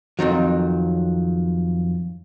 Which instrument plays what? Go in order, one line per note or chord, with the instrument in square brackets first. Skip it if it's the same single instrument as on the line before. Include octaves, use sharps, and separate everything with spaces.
[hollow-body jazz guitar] F2 C3 D#3 F#3